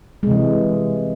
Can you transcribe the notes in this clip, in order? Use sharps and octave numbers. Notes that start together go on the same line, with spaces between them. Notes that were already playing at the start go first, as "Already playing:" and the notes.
C3 E3 G#3